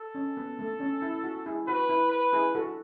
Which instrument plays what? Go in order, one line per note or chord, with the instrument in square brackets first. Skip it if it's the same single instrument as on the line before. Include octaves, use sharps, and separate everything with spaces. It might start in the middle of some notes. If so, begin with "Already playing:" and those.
Already playing: [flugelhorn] A4
[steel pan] C#4
B3
A3
C#4
E4
F#4
E4 G#4
[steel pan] F#4 [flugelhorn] B4
[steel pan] E4
[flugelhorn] B4
[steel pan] E4 G#4
F#4 A4